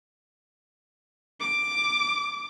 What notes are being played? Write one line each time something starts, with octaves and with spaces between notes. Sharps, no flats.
D6